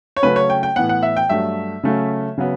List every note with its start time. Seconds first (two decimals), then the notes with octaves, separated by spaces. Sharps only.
0.17 C#5
0.23 C#3 F#3 A3 C#4 B4
0.36 C#5
0.50 G5
0.63 G5
0.76 A2 E3 B3 F#5
0.89 F#5
1.03 E5
1.17 G5
1.29 G2 F#3 A3 E5
1.83 C#3 F#3 A3 C#4
2.38 C#3 F#3 B3